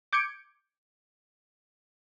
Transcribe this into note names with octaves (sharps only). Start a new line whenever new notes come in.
D6 G6 G#6 C#7 D7